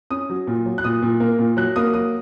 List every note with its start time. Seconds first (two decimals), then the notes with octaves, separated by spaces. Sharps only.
0.10 C#4 D#6
0.30 F#3
0.47 A#2
0.66 F#3
0.78 F#6
0.84 A#2 D#6
1.02 A#2
1.20 A#3
1.39 A#2
1.57 F#3 F#6
1.76 A#3 D#6
1.94 F#3 D#6